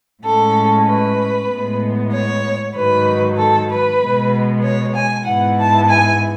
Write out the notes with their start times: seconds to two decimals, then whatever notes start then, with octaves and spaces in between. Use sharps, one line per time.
0.24 A2 G#3 C#4 A4
0.87 B4
1.50 A2 G#3 B3
2.12 C#5
2.75 G#2 D#3 F#3 B4
3.38 A4
3.70 B4
4.01 B2 G#3 B3
4.64 C#5
4.95 G#5
5.27 G#2 E3 B3 F#5
5.58 A5
5.89 G#5